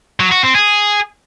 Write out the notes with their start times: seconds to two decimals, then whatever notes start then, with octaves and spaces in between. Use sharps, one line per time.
0.20 F#3
0.31 F#4
0.43 C4
0.55 G#4